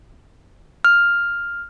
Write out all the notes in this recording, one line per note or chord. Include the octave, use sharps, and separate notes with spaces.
F6